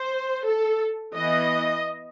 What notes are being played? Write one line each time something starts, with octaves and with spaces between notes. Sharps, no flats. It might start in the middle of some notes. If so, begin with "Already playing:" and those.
Already playing: C5
A4
E3 B3 D#5